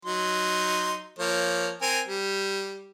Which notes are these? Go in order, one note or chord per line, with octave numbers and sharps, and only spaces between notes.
F#3 D#4 C6
F3 A#3 C#5
C4 A#4 G#5
G3